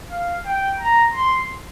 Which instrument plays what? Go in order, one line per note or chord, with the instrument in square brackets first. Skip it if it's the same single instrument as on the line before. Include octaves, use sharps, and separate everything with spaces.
[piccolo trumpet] F5
G5
A#5
C6